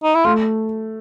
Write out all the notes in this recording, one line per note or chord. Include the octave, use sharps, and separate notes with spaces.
D#4
E4
A3 F4